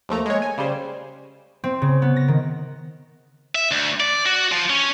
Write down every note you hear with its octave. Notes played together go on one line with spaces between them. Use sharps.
D#2 F3 A3 A#5
G#3 C#5
G#5
C#3 G3 C5
C4
C#3
B3
A#6
D#3
E5
D2
D5
F#4
F3
C#4